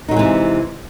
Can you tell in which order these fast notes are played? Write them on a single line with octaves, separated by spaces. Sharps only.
D#4 F#3 G#3 E3 C3